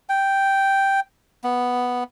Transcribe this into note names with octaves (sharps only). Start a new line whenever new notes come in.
G5
B3